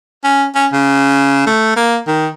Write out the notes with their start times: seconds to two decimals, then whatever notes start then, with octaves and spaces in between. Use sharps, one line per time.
0.24 C#4
0.55 C#4
0.73 C#3
1.47 A3
1.76 A#3
2.07 D#3